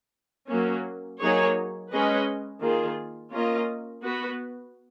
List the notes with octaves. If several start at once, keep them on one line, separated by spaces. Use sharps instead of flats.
F#3 A#3 C#4
F#3 A#3 D#4 G#4 C#5
G#3 C#4 G#4 B4 D#5
D#3 A#3 F4 G#4
A#3 C#4 F4 A#4 D#5
B3 F#4 B4